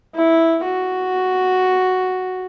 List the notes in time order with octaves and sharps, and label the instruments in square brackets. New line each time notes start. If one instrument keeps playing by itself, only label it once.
[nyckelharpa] E4
F#4